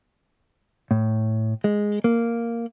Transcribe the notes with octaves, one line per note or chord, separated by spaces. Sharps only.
A2
G#3
A#3